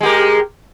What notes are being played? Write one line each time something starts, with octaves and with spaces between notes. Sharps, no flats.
G#3 G4 A#4